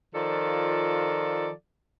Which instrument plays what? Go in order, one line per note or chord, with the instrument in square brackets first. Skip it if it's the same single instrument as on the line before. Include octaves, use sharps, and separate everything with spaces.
[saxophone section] D#3 F3 F4 A4 D5